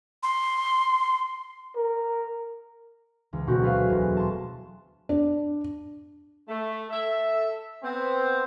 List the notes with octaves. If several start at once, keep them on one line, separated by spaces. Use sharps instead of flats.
C6
A#4
C#2 E3
D2 B2 C4 F#4 G6
F#3 A3 G#4 B4 C5 F5
E1
A5 C6
D4
A3
A4 E5
B3 C4